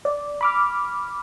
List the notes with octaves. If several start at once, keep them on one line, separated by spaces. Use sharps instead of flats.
D5
B5 D6 F6